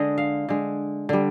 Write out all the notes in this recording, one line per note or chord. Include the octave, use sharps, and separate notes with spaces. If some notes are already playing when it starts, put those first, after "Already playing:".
Already playing: D3 G#3 D#5
F5
D3 G#3
D3 G3